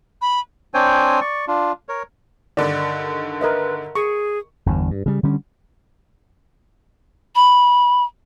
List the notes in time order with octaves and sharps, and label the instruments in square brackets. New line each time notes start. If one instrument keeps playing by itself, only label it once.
[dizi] B5
[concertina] C4 D4 C5 C#5 G5 G#5
D5 C#6
D4 F4
A#4 C#5
[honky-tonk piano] G2 D3 D#3 [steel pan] D5
[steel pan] A#4 D#5 E5 [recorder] B4
[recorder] G#4 [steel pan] C#6
[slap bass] G1 E2 G2
G2
C#3 G3
D3 G3 C#4
[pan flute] B5